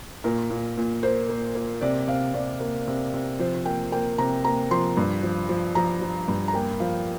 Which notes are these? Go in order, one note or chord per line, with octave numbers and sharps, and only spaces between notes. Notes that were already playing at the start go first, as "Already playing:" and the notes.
A#2 A#4
A#2
A#2
A#3 C5
A#3
A#3
C3 D5
C3 F5
C3 D5
A#3
C3
C3
F3 C5
A#3 G5
A#3 G5
C3 A#5
A#3 A#5
F3 C6
G2
F3
F3
F3 A#5
F3
G2
A#5
A#3 G5
F3 F5